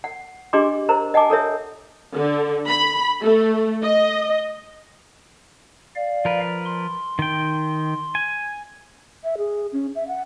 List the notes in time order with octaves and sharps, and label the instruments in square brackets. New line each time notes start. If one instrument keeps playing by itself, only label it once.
[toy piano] F#5
D4 G4 G#4 D#5 C6 D6
A#4 C5 A#5
D#5 F#5 G#5 A5 D6
A4 A#4 C#5 E5
[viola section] D3
B5
A3
D#5
[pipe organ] D5 F5
[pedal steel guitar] F3 A#4 B4
[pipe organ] C6
[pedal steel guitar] D#3 G5
G#5
[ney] E5
G#4
C#4
E5
F#5